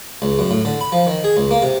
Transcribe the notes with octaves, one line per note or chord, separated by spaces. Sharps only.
C#2
F#2
A2
D3
B5
F3
D#3
G#4
C#2
A#3
C3